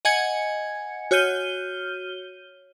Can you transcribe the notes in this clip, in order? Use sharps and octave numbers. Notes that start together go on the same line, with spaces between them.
D#5 F#5 G#5 G#6 C#7
F#4 C#5 F6 G6 D#7 G7